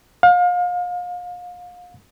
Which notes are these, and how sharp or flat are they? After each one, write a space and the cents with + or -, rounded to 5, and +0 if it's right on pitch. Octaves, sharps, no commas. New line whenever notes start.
F5 +35